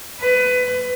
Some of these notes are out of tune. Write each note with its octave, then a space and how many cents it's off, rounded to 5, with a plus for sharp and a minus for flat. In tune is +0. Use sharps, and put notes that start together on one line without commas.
B4 +20